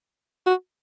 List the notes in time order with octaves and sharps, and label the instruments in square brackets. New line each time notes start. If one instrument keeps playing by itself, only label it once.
[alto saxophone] F#4